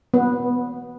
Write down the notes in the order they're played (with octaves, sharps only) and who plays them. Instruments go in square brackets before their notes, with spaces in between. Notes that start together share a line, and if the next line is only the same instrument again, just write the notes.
[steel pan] B3